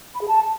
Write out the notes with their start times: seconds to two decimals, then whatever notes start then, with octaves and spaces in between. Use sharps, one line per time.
0.15 B5
0.21 G#4
0.27 A5